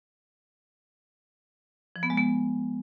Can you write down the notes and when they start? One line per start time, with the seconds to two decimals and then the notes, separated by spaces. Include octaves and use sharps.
1.96 F3
2.03 B3
2.10 G#3
2.17 B3